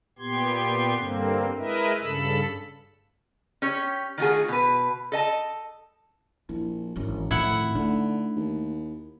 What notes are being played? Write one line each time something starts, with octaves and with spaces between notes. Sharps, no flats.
A#2 B3 G4 C6 G#6
G2 D3 A#3 C4
G#3 E4 A#4 B4 D#5 E5
G2 C#3 A4 B5 E6
C#4 G4 C#5
D#3 A3 F4 F#4 G#4
B2 B4
A4 D#5 A5
A#1 E4
G#1 F#2 E3
F2 A2 D#3 E4 F#5
D3 A3 D#4
D#2